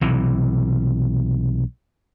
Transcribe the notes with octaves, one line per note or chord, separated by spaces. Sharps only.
B1 C3 E3